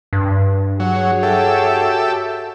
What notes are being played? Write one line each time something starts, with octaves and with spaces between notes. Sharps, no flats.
G2
F#3 F#4 G#4 C#5
G4 A4 E5